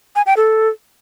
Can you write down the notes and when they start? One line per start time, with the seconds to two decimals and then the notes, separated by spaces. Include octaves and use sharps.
0.16 G#5
0.26 G5
0.37 A4